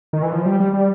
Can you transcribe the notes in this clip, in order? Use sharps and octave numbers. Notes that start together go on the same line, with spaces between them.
D#3
E3
F3
G3
G3
G3